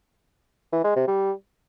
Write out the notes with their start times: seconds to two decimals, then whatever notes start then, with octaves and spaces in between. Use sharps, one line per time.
0.73 E3
0.84 G#3
0.96 C3
1.08 G3